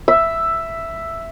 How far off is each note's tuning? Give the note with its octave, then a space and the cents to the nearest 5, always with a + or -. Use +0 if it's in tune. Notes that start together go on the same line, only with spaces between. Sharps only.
E5 +5